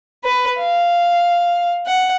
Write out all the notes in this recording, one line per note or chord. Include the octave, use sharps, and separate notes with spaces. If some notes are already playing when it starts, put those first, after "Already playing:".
B4
F5
F#5